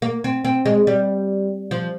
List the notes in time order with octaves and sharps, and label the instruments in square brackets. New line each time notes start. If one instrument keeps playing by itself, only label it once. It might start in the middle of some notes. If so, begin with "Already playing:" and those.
[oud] A#3
C4
C4
G#3
G3
F3